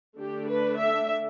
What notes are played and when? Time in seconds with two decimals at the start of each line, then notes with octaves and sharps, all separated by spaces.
0.18 D3 A3 D4 G4
0.48 B4
0.78 E5